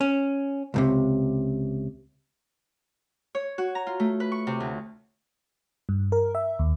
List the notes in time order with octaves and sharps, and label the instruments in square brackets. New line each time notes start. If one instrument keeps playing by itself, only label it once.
[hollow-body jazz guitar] C#4
C#2 A2 C3
[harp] C#5
F#4
A#5
F4
A3
B4
C#6
C3
D2
[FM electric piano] G2
A#4
E5
D#2